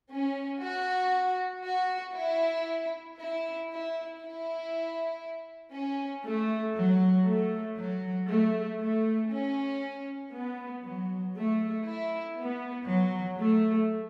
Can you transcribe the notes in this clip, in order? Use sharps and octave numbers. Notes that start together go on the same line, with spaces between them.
C#4
F#4
F#4
E4
E4
E4
E4
C#4
A3
F#3
A3
F#3
A3
A3
C#4
B3
F#3
A3
E4
B3
F#3
A3